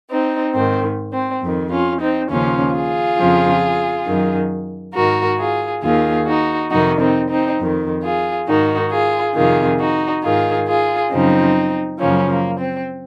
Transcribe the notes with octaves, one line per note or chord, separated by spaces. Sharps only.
C4 D#4
G#2 D#3 C4
C4
F2 D#3
C#4 F4
C4 D#4
D#2 C#3 F3 C#4 F4
F4 G#4
F2 C#3 F3
F#2 D#3
G#2 D#3 F#4 A#4
F4 G#4
D#2 D#3 F4 G#4
D#4 F#4
F2 C3 D#3 D#4 F#4
C4 D#4
C4 D#4
F2 D#3
F4 G#4
G#2 D#3 D#4 F#4
F4 G#4
F2 C3 D#3 F4 G#4
D#4 F#4
G#2 D#3 F4 G#4
F4 G#4
F#2 C#3 F3 C4 D#4
F#2 C#3 F3 A#3 C#4
A#3
C4